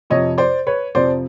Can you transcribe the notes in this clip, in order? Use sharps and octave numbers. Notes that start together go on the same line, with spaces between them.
F2 C3 F3 C#5 D#5
C5 D5
B4 C#5
F2 C3 F3 C5 D5